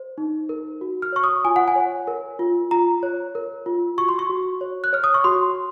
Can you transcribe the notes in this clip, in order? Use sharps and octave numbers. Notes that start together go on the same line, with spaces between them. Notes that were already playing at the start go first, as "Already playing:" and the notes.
Already playing: C5
D#4
A#4
F#4
F6
C#5 C#6
D#6
F4 G#5
F#5
G#5
C#5
A#4
F4
F4 A#5
C#5
A#4
F4
F#4 C#6
C6
C#6
F#4
C#5
F#6
C#5 F6
D#6
C#6
F#4 C6